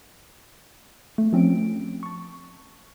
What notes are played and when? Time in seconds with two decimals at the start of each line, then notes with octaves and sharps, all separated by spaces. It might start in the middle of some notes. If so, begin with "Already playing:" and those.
1.18 A3
1.33 F3 C4 C#4 D7
2.03 A5 C#6